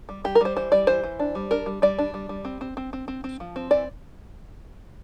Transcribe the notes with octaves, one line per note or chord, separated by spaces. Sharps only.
G3
G3 G4
A#4
G3 C5
E3 C5
G3 D5
E3 C5
E3
D4
G3
D4 A#4
G3
G3 D5
D4
G3
G3
C4
C4
C4
C4
C4
C4
F3
C4
E3 D5